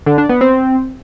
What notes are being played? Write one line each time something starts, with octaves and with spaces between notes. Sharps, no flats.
D3
D4
B3
C4